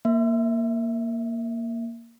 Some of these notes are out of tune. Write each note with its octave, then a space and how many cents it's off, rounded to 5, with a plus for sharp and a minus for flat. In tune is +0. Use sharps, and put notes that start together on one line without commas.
A#3 +0 E5 +0